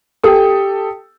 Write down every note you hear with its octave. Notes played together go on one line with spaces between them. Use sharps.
G4 A4 D#6